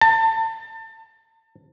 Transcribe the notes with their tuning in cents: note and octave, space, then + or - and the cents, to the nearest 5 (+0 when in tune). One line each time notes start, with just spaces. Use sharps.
A5 +30